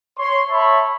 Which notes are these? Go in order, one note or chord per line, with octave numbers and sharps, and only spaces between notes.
C#5 C6
C#5 E5 A5 B5